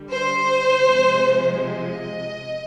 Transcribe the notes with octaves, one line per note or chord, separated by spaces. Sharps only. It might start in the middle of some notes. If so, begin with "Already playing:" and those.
Already playing: D3 G3
C5
C3 F3 G#3
D#5